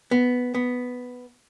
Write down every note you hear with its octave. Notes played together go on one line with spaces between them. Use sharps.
B3
B3